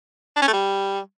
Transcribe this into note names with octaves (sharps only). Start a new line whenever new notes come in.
D4
C#4
A3
G3